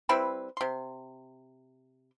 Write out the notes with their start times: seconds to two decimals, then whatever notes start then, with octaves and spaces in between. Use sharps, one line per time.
0.09 G3 C4 E4 B4
0.57 C3 C6